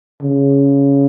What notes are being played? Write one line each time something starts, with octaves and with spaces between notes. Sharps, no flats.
C#3